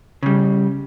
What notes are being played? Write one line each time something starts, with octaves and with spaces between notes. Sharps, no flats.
C#3 G3